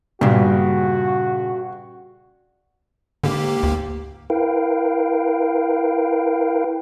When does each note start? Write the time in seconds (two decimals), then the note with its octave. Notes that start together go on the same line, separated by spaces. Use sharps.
0.21 G2 A#2 C#3 F#4
3.24 G#2 D3 A#3 G4
3.63 D2
4.30 E4 A#4 B4 F5 G5